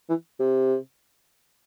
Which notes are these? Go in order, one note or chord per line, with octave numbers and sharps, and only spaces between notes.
E3
C3